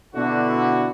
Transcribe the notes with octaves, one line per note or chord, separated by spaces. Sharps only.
B2 D3 E4 F#4